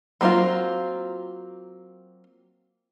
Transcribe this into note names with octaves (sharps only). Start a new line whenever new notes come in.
F#3 A#3 C4 D4 F4